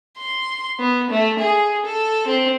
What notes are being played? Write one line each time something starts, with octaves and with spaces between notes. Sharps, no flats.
C6
B3
A3
G#4
A4
C4